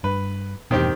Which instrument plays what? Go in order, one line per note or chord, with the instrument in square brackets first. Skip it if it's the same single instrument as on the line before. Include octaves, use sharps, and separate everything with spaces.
[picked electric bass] G2 [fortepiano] B4
[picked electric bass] E2 G2 B2 [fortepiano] D#3 C4 G4